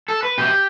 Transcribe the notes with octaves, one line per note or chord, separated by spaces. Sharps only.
A4
B4
B2 G4